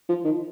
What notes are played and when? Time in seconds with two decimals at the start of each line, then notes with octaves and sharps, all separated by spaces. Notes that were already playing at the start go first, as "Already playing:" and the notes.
0.09 F3
0.24 D#3